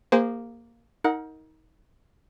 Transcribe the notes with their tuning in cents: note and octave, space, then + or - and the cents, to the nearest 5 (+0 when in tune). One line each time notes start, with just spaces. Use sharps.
A#3 +0 G#4 -40 C5 -15
D#4 +25 A#4 -10 F#5 -15